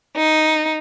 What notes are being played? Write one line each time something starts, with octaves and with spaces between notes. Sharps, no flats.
D#4